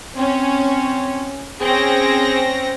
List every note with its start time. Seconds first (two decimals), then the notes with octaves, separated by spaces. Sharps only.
0.16 C4 C#4
1.60 C4 C#4 G#4 A#6